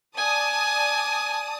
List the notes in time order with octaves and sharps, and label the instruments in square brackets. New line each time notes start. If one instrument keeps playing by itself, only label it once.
[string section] D5 A5 D#6 [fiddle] G#5